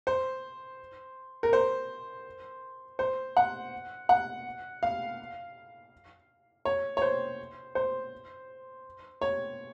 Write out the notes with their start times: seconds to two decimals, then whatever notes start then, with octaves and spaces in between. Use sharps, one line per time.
0.07 C5
1.43 A#4
1.53 C5
2.99 C5
3.37 F#5
4.09 F#5
4.83 F5
6.65 C#5
6.97 C#5
7.02 C5
7.75 C5
9.21 C#5